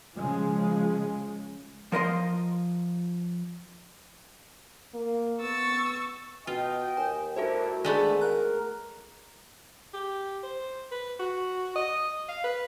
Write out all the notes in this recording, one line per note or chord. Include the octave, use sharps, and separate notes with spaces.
C#3 F3 G#3
F3 A#4 D#5 C6
A#3
B3 C#6 E6 A6
B2 F4 D#5 G5
D#2 G#5
G2 A3 E4 F#4 A4 A#4 C5
G#2 D#3 G#3 A3 B3 D4
A#4 F#6
G4
C5
B4
F#4
D#5
F5
B4